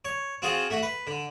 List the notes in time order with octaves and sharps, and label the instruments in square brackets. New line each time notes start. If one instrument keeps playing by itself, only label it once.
[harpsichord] C#5
C4 F4 F#4 G#4 C5
A3 F#4
B4
D3